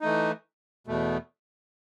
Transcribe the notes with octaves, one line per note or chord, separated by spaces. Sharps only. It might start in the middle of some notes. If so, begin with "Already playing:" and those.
E3 A3 D#4
E2 B2 A3